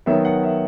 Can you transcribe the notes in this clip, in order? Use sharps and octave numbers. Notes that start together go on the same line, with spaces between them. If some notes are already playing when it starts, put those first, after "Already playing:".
D#3 F#3 B3 E5
F#5
E5